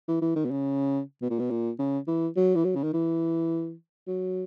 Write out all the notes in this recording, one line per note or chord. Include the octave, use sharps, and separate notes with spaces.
E3
E3
D#3
B2
C#3
B2
A#2
B2
A#2
C#3
E3
F#3
E3
F#3
C#3
D#3
E3
F#3